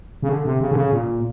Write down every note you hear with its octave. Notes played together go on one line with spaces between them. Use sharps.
C#3
D3
C3
C#3
D3
C#3
A#2